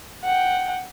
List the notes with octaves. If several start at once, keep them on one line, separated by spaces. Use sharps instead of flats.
F#5 G5